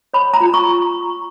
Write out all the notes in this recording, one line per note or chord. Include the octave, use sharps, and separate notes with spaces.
C#5 B5
A#5
F4
C#6